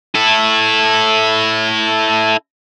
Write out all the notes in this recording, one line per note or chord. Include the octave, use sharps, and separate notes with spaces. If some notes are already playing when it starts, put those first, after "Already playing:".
E4 A4